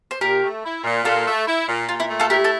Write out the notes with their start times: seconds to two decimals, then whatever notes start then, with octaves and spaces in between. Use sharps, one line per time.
0.11 C5
0.21 A#2 G4 A#4
0.43 A3
0.64 E4
0.84 A#2
1.05 A#2 F4 A4
1.26 A3
1.47 E4
1.68 A#2
1.89 A#2 F4
2.00 E4
2.09 A3
2.20 F4 A4
2.30 E4 G4 A#4
2.44 A4